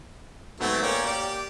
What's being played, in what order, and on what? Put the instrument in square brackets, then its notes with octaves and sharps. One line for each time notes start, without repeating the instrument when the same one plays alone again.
[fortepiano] G#2 B3 [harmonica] F#3 A3 C4
[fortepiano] A#3 [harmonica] C#4 D5 G5
[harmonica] G4 D5